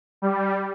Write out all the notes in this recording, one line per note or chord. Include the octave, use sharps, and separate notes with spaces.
G3